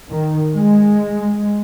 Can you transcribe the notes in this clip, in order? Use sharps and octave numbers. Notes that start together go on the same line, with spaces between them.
D#3
G#3